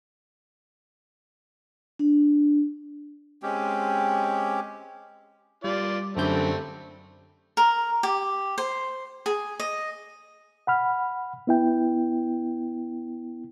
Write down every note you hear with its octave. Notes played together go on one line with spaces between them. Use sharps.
D4
G#3 C4 C#4 G4
G3 F4 D5
F#2 D3 G3 A3 C4 G6
A#4
G4
C5
G#4
D#5
F#5 B5 F6
B3 E4 G5